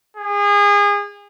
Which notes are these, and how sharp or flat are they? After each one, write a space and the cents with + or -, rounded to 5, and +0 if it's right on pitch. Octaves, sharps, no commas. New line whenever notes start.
G#4 -30